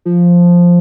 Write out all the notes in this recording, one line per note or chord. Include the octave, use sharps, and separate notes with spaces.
F3